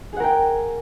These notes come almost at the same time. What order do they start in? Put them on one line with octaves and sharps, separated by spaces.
G#4 F#5 A#4 G5